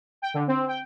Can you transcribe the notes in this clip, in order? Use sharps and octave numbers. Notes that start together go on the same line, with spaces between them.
G5
D3
C4
G5